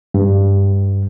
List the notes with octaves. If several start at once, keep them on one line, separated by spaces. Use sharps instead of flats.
G2